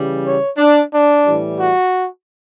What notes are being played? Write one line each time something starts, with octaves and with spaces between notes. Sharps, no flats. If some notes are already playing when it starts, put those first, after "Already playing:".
Already playing: C#3 E3 G3
C#5
D4
D4
A2 E3 G3
F#4